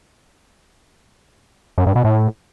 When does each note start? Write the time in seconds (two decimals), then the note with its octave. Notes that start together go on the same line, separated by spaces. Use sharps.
1.78 F#2
1.87 G2
1.96 B2
2.04 A2